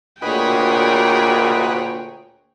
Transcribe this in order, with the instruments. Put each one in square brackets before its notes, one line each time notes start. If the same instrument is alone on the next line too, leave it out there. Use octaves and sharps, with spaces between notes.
[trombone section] D2 A#2 [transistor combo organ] F#4 B4 D#5 [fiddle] G#4 C#5 [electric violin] G5